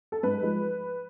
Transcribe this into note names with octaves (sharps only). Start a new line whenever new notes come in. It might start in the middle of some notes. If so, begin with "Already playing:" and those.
A4
G#2 B4
F3 G#3